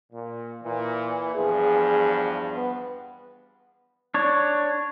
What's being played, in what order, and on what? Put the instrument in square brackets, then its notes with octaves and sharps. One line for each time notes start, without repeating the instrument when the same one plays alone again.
[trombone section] A#2
[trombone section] A#2 [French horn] E3
[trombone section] E2 G2 F3 [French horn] G#4
[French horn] B3
[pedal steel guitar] D4 C#5